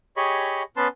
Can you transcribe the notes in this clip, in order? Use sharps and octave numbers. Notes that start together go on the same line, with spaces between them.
G4 G#4 C#5 D#5 B5 C#6
B3 C#4 B4 A5 C6